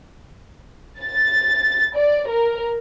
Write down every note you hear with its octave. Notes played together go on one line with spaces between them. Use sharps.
A6
D5
A#4